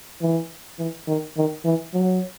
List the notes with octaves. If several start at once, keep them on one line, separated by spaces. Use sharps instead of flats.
E3
E3
D#3
D#3
E3
F#3